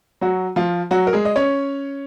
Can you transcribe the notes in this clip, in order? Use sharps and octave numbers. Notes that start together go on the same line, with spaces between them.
F#3 F#4
F3 F4
F#3 F#4
A#4
G#3 G#4
D#5
C#4 C#5